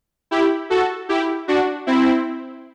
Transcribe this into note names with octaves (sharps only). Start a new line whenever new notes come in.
E4 G4
F#4 A4
E4 G4
D4 F#4
C4 E4